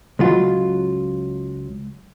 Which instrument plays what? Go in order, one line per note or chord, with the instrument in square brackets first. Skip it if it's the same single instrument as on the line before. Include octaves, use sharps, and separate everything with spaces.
[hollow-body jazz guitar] C#2 F#3 F4